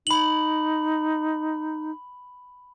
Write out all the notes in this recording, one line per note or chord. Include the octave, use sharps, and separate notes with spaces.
D#4 B5 F#7